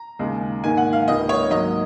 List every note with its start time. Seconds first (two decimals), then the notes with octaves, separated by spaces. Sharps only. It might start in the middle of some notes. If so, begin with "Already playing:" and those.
Already playing: A#5
0.19 D#2 C#3 G#3
0.63 G#2 D#3 A#3 G#5
0.77 F#5
0.93 F5
1.08 C#2 C3 D#3 A#3 D#5
1.29 C#5
1.50 G#2 F#3 A#3 D#5